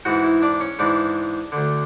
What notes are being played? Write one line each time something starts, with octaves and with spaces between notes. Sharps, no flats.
G#2 E3 F#4
E4
D4
C#4
G#2 E3 D4
D2 D3